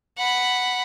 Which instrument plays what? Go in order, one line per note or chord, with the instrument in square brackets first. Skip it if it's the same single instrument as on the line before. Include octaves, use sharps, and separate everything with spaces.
[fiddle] F#5 B5